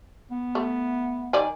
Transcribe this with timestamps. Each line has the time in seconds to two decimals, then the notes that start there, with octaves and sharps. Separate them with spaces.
0.31 B3
0.55 A3
1.33 D#3 D5 G#5